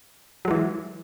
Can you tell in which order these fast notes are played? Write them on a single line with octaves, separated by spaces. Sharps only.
F#3 G#3 E3